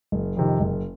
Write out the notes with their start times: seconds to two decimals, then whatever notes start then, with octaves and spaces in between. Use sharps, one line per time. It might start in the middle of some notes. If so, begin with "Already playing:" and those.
0.12 F#1
0.37 F2 C3 D#3
0.60 F#1